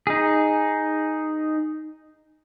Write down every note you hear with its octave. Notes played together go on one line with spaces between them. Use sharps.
D#4 G#4